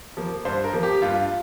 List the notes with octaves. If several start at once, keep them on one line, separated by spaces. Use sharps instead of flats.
F3 A#3
G2 C5
A#4
F3 A#3
G4
G2 F4